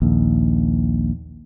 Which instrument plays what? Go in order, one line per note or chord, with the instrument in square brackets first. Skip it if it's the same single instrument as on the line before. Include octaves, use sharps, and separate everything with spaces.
[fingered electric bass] A#1 D#2